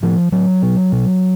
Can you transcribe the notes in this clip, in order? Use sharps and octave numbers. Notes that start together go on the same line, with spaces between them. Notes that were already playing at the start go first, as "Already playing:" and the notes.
A2 F3
A2 F#3
B2
B2